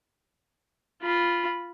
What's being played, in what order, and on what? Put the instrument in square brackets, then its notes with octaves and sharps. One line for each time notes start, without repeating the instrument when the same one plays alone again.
[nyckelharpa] F4 B5